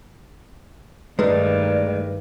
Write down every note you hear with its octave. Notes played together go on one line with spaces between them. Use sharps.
G2 D#3 G#3 A3 D#4 B4 D5